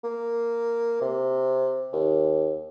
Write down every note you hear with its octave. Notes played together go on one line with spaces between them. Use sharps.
A#3
C3
D#2